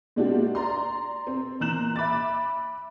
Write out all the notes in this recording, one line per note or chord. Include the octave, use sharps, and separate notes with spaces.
A#2 G#3 D4 E4 F#4 G4
D5 A#5 C6
C4
A#2 E3 A#5 F#6 E7 F#7
E5 B5 D6 A6